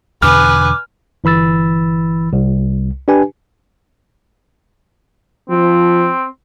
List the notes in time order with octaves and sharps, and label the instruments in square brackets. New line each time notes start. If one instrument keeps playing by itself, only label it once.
[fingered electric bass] E2 B2 D3 [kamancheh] B4 G#5 [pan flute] D6 [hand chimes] F6
[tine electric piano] G1 E3 B5 E6 A6
C2
D4 G4 B4 G#5
[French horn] F3 [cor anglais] C4